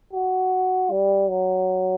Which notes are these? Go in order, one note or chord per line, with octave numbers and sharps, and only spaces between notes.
F#4
G3
F#3